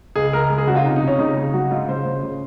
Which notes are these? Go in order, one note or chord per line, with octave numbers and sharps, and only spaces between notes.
C#2 G#4
C#2 A#4
G#3
G#4
C#3 F#4
F4
C3 D#4
D#4
C3
C#4
C#3 D#4
C#3
F#3 F#4
G#2 F4
C#3 C5
C#3
C#3